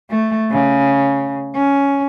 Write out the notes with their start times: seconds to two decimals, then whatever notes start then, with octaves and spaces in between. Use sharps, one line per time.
0.10 A3
0.51 C#3
1.56 C#4